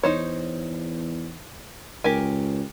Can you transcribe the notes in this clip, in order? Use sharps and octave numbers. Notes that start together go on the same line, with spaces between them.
E2 D#4 C5 C#5
C#2 G4 A#4 G#5